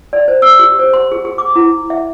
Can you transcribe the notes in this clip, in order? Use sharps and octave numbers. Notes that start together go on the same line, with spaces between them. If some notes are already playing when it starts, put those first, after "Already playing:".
D5
C5
E6
G4
C5
C6
G#4
G#4
D6
E4
E5